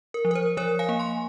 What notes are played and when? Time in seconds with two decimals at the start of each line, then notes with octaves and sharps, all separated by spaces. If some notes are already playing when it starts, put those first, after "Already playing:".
0.14 A#4
0.25 F3
0.31 A#4
0.35 C5
0.57 F3 A#4 C#5
0.79 F5 G#5
0.89 A#3
1.00 G#5 C6